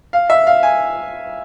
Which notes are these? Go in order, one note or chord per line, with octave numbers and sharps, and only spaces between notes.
F5
E5
F5
G#5